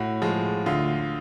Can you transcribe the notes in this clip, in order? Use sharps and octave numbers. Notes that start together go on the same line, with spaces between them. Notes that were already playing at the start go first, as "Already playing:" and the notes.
Already playing: A2 F#4
F3 G#3
D2 F4